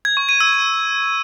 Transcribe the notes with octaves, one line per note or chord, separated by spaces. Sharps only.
G#6
C#6
D#7
E6